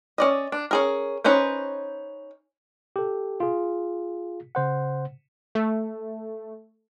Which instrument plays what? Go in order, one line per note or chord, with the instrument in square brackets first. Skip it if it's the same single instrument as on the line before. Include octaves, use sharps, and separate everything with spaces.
[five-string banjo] C#4 D5 D#5
D4
C#4 G#4 A#4
C#4 D#4 B4 C5
[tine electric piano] G4 A4
F4 G#4
C#3 C5 F#5
[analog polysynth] A3